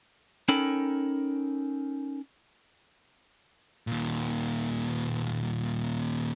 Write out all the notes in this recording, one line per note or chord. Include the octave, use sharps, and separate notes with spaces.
C#4 D#4 A4 A#4 G5 B5
D#2 A#2